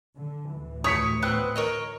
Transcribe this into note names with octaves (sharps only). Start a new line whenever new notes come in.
D3
D2 A2 E3
C#5 D#6 B6 C#7
B3 C4 F#6
A#4 C#5 D#5